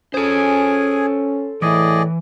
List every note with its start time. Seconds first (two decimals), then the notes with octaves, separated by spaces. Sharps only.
0.14 C#4 G#4 A4 C5 G#5
1.62 A2 E3 G#4 D5 D#5